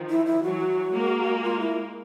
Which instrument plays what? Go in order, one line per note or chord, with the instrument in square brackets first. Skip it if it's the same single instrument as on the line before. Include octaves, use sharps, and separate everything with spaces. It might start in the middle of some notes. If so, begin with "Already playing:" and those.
Already playing: [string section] D#3 F3
[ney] E4
E4
[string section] E3 F#3 [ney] F#4
[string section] G#3 A#3
[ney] F4
E4